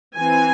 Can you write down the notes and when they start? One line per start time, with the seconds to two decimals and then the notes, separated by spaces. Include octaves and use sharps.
0.17 E3 C4 G#5